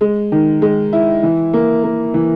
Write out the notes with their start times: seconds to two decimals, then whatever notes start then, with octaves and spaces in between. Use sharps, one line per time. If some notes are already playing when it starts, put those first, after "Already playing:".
0.01 G#3
0.32 D#3
0.62 G#3
0.93 E4
1.23 E3
1.53 A#3
1.84 A#3
2.14 E3